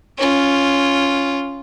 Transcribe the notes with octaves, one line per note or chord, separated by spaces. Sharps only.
C#4 F4